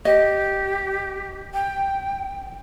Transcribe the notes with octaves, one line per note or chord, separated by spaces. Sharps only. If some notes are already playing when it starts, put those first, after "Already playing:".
G4 D#5
G5